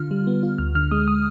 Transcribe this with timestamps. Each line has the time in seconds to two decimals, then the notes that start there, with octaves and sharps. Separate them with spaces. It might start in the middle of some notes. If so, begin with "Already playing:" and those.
Already playing: D3 F4 F6
0.11 G3
0.27 B3
0.43 F4
0.58 D2 F6
0.75 D3 F6
0.91 G#3 D#6
1.08 D#6